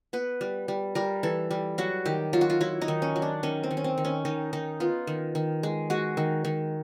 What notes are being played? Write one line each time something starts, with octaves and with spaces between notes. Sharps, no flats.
B3 B4
G3
G3
G3 A#4
E3 A4
G3
F#3 F#4
D#3 G4
F#3 F4
F#4
F4
F#3 E4
D#4
D#3
C#4
F#3
D4
D#3 C#4
C4
D#3
C#4
C4
D#3
C#4
D#3 D#4
D#3 D#4
B3 F4
D#3
D#3
G#3
G#3 F#4
D#3
D#3